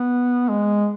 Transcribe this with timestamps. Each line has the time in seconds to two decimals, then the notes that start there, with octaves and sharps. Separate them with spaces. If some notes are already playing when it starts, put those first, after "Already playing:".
Already playing: B3
0.49 G#3